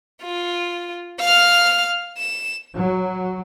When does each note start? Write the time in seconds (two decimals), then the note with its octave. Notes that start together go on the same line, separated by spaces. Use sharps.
0.23 F4
1.20 F5 F6
2.18 E7
2.74 F#3